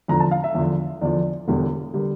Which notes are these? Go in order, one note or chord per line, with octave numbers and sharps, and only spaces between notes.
E2 D3 F3 A#5
A5
F5
E5
E2 D3 F3
E2 D3 F3 D5
E1 E2 D3 G3
D3 G3 A#4